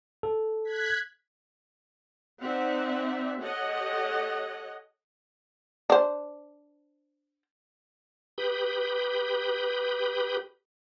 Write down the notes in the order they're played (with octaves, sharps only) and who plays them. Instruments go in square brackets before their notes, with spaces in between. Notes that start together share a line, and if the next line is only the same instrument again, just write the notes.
[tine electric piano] A4
[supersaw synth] F#6 G#6 B6
[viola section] C4 D#4 D5 E5 F#5
G4 A4 C#5 D#5 F#5
[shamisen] D4 C5
[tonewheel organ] G4 B4 B5 D#6 G6